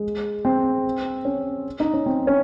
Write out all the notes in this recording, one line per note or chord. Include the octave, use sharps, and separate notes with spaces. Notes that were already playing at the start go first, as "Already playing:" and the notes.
Already playing: G#3
C4
C#4
D#4
C#4
C4
C#4